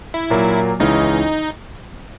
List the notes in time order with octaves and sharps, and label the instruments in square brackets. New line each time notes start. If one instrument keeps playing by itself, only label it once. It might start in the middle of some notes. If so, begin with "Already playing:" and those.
[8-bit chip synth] E4
[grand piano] A#2 F#3 A#3
[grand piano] C#2 C#3 E3 [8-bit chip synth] D#4